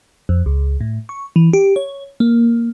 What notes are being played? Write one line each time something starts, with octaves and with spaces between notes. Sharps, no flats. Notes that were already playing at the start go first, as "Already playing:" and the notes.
F2
C#2
A2
C#6
E3
G4
C#5
A#3